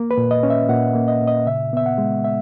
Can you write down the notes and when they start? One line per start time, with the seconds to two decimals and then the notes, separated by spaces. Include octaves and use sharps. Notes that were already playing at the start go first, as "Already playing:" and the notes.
Already playing: A#3
0.11 B4
0.17 A#2
0.31 D#5
0.43 C#4
0.50 E5
0.69 A#2 F#5
0.95 A#3
1.08 D#5
1.21 A#2
1.27 D#5
1.46 C#3 E5
1.73 B3 E5
1.86 F#5
1.98 G#3
2.24 E5